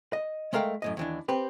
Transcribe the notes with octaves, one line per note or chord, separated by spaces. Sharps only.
D#5
G#3 A3 A#4 F5 G5
F#2 A2 D#5
D#2 E3 D4
C4 G4 B4